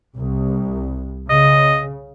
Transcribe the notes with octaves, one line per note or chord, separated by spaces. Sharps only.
C2
C#3 D#5